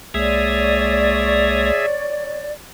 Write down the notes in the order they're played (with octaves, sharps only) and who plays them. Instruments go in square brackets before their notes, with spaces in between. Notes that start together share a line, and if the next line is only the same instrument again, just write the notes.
[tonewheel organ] C2 G#3 A#3 [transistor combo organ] G#4 E5 [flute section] C#5 D5